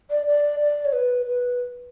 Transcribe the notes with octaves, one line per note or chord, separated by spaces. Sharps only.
D5
D5
D5
C#5
B4
B4